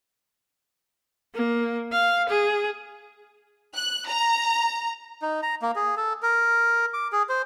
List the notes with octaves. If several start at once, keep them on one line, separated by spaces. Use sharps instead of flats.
A#3
F5
G#4
F#6
A#5
D#4
A#5
A#3
G#4
A4
A#4
D6
G#4
C5